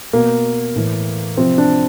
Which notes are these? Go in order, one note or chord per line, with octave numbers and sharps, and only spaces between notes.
B2 A#3
A2 E3
C3 F3 C4
D4